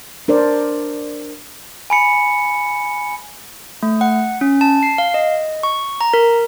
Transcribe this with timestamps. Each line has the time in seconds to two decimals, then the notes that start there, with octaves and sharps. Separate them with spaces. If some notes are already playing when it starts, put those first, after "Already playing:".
0.28 D4 A#4 C5 D5
1.90 G#5 B5 C#7
3.83 A3
4.01 F#5
4.41 C#4
4.61 A5
4.83 C7
4.98 F5
5.14 D#5
5.63 C#6
6.01 A#5
6.14 A#4